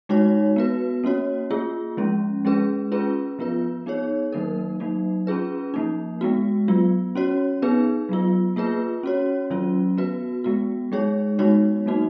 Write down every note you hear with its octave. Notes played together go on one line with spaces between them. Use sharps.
G#3 D#4 F#4 C#5
B3 F#4 B4
A#3 C#4 F#4 C#5
A#3 F4 G#4
F3 G#3 C#4
G#3 C#4 G#4 B4
C#4 F4 G#4 B4
F3 B3 F4 B4
B3 D#4 G#4 C#5
D#3 F#3 A#3 D#4 A#4
F#3 A#3 D#4
C#4 F4 G#4 B4
F3 A#3 D#4
G#3 B3 F#4
F#3 B3 F4
C#4 F#4 C#5
B3 D#4 G#4 B4
F#3 B3 F4
A#3 F4 G#4 B4
C#4 F#4 C#5
D#3 F#3 C#4 F4
B3 F#4 B4
G#3 B3 F#4
G#3 D#4 G#4 C#5
G#3 B3 D#4 F#4 C#5
F#3 A#3 D#4 F#4